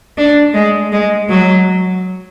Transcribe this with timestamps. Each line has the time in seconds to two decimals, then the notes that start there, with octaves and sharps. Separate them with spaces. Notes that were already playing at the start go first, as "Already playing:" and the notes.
0.17 D4
0.54 G#3
0.92 G#3
1.29 F#3